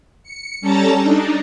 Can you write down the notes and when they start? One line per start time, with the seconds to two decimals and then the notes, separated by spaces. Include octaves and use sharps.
0.23 C#7
0.61 G3 C#4 A4 A5 A#5 A6
1.01 D4 D#4